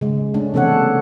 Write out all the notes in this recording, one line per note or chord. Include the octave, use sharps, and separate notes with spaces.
C#3 G#3
A3 C#4 D4
C3 E3 A#3 A4 C#5 F#5